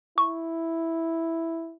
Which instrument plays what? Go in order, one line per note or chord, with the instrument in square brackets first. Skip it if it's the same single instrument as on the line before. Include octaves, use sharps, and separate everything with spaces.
[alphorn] E4 [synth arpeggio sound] C#6